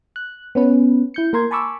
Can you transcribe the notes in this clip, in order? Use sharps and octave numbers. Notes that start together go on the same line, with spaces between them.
F#6
B3 C#4 B4
E4 G6 C#7
A#3 A#4 C6 G#6
G#5 A5 B5 C#6 D6 E6